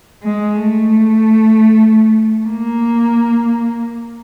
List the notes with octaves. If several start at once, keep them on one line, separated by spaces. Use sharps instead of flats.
G#3
A3
A#3